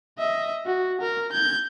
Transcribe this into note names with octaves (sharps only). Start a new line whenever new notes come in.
D#5 E5
F#4
A#4
G6 G#6